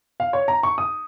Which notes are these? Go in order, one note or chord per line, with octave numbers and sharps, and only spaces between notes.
F5
C#5
A#5
C#6
D#6